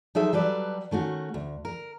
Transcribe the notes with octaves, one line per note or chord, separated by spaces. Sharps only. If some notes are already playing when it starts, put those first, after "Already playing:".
F#3 D#4 G#4 A4 C5 E5
F#3 G3 A4 B4 D5
D#3 A3 C#4 F#4
D2
A#4